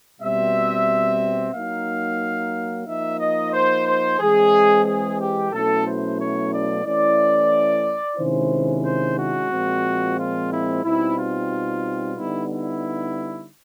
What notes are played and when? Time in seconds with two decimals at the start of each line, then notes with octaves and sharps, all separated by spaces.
0.20 B2 G3 C4 E5
1.53 F#3 A#3 D#4 F5
2.86 F3 A#3 D#4 E5
3.19 D#5
3.53 C5
3.86 C5
4.19 E3 G#3 C4 G#4
4.85 G#4
5.19 G4
5.51 B2 F#3 A3 C#4 E4 A4
5.85 C5
6.18 C#5
6.51 D5
6.85 E3 A3 C#4 E4 D5
8.17 C3 D#3 G#3 C#4 E4 C5
8.84 C5
9.16 F#4
9.50 A#2 F3 G#3 C4
10.17 F4
10.50 E4
10.83 B2 G3 C4 D#4 E4
11.16 F4
12.16 D3 G3 B3 D#4 E4
12.49 E4